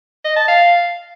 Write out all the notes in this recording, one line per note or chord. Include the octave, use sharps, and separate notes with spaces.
D#5
A5
F5